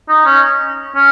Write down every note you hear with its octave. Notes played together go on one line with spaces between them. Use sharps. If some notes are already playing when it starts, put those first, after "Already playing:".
D#4
C#4
C#4